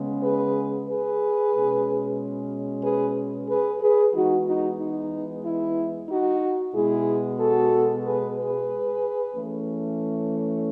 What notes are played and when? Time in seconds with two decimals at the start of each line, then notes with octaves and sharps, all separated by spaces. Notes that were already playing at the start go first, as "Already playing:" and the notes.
Already playing: C#3 G#3 B3
0.23 G#4 B4
0.88 G#4 B4
1.53 B2 G#3 C#4
2.83 G#4 B4
3.49 G#4 B4
3.81 G#4 B4
4.14 E3 G#3 B3 D#4 F#4
4.46 D#4 F#4
4.79 D#4
5.45 E4
6.09 D#4 F#4
6.74 B2 G#3 B3 E4 G#4
7.39 F#4 A4
8.05 G#4 B4
8.37 G#4 B4
9.35 E3 A3 C#4